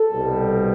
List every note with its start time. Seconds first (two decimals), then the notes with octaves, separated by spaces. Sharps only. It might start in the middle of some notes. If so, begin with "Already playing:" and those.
Already playing: A4
0.11 C2 B2 G3